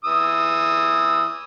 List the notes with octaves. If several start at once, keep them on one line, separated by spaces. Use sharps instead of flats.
E3 D#6 E6